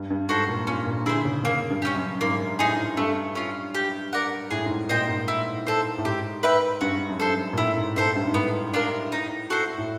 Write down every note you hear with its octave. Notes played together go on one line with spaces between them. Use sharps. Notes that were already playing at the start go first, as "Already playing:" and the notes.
Already playing: G2
G2
G#2 F#4 A4 C5
A#2
A#2 C#4
A#2
D3 E4 G#4 C5
C#3
C#3 A#3
G2
C#4 E4 G4
F#2
G#2 A#3
A2 D#4 G#4
G2 A3
C#4 F4
G4
A#4 D5 F#5
A2 G#4
G#2
A2
A#2 C5 D#5 G5
G#2
E4
A4 C5
A2
G#2 G4
B4 E5 G5
G2 F#4
F#2
G2 A4 C5
A#2
A2 E4
G#2
G#2 A4 C5 E5
G2
G#2
A2 B3
D4 F4 A#4
D#4
F#4 A4 C5
A2